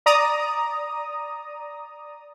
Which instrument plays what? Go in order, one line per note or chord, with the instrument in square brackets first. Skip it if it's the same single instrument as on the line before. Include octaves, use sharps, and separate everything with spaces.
[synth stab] D5 A#5 D#6